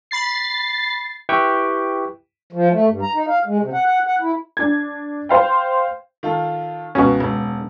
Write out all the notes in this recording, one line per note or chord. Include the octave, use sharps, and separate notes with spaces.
B5 A6 C7
E4 G4 B4 G5 C#6
F3
A3
G2
A#5
D#4
F5
G#3
C3
F#5
F#5
F#5
E4
D4 G#6
C5 F5 G5
D#3 F4 A4
C#2 B2 C#4 F#4
E1